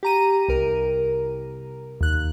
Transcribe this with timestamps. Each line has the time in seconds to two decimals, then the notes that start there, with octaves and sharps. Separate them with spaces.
0.03 G4 A#5 D#7
0.48 C2 A#4
2.01 D#2 F#6